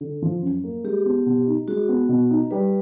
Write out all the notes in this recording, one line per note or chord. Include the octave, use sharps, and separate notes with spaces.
D3
F3
F#2
A#3
G#3 G4
B3
B2
D#4
G#3 F#4
B3
B2
D#4
G3 B4